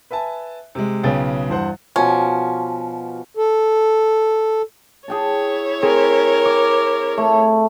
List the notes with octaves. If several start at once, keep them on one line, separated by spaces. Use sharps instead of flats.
B4 E5 G#5 A5
C3 G#3
B1 C#3 B3 G#4 G5 A6
E2 G2 C5 F#5
B2 F3 C#4
A4
E4 G#4 C#5 G5 A5
C4 G#4 A#4
D6
A3